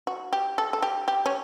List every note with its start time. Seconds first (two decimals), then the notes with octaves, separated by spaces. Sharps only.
0.07 F#4
0.33 G4
0.58 A4
0.73 A4
0.82 G4
1.08 G4
1.26 C#4